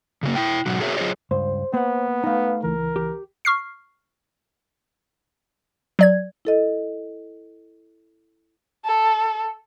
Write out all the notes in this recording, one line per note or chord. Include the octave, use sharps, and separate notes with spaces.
C#3 F#3 A#3
E4 G5
G#2 B2 F#3 F#4
F#4 G#4 A#4 C#5 E5
F#3 F4 G#4 C5 C#5 D#5
C#2 G2 C5
A#3 B3 F#5
A3 D#4 B4 F5
C#2 E3 A#4
G4
C#6 F6 C7
F#3 D5 G#6
E4 A4 D#5
A4